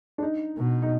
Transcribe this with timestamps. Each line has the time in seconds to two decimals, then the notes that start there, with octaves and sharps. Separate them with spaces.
0.18 D4
0.22 D#4
0.58 B2
0.82 D#4